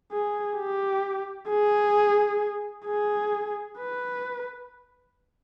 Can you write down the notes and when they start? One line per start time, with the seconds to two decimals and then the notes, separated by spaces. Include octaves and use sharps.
0.12 G#4
0.58 G4
1.49 G#4
2.87 G#4
3.79 B4